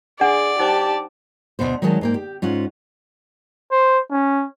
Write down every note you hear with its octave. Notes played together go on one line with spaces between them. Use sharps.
D4 G#4 D5 F#5 G#5
D#4 G4 C5 A5 D6
D2 G#2 B2 B3 C5
D#3 F#3 G#3 C#5 D#5 A5
G#2 A#3 G5
G4
G#2 C#4 F4 F#5
C5
C#4